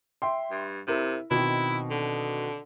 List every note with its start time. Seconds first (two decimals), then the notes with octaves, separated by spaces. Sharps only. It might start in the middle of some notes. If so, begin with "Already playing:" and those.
0.22 E5 G5 C6
0.51 G2
0.87 C3 E4 A#4
1.31 B2 D#3 C4 E4
1.90 D3